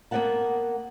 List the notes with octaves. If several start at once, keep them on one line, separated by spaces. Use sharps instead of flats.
A#3 B3 D4 A#4 F#5 A5